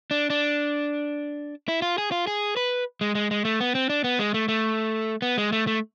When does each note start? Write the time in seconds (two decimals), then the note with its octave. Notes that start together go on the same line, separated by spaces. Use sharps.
0.11 D4
0.30 D4
1.68 E4
1.82 F4
1.98 G#4
2.12 F4
2.27 G#4
2.57 B4
3.01 G#3
3.15 G#3
3.31 G#3
3.45 A3
3.60 B3
3.75 C4
3.90 D4
4.04 B3
4.19 G#3
4.34 A3
4.48 A3
5.22 B3
5.38 G#3
5.52 A3
5.67 A3